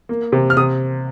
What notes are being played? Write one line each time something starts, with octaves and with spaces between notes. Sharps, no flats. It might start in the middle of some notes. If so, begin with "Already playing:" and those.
A#3
C3
F6
C3 D#6